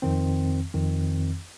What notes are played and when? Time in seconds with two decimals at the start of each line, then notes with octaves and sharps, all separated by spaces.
0.02 F2 D#3 C4
0.74 F2 D#3 C4